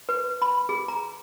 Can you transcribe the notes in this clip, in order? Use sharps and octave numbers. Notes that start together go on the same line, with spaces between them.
B4
B5
G#4
A#5